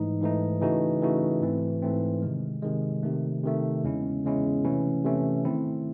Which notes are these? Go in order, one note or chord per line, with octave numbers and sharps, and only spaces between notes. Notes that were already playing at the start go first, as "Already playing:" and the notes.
Already playing: G#2 E3 A3 D#4
G#2 E3 A3 D#4
C#3 E3 A3 D#4 F#4
C#3 E3 A3 D#4 F#4
G#2 E3 A3 C4
G#2 E3 A3 C4
C3 D#3 G#3
C3 D#3 G#3
C3 D#3 A3
C3 D#3 A3
E2 C#3 G#3 C#4 E4
E2 C#3 G#3 C#4 E4
C3 E3 A3 C#4 E4
C3 E3 A3 C#4 E4
D#3 A3 C4 E4